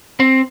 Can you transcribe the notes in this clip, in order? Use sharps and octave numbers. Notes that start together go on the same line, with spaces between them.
C4